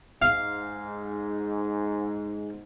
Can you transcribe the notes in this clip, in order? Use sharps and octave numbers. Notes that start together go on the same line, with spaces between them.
G#2 F5